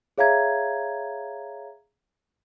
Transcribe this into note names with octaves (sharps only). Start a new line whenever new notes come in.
G#4 C#5 E5 F5 A#5 G#6